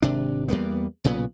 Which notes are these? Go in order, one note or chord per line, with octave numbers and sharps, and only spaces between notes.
G#1 C3 D4
E2 G3 A#3 B3
B1 A#2 C#3 B3